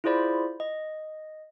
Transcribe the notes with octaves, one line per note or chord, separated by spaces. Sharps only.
E4 F4 G#4 C5 D5 B5
D#5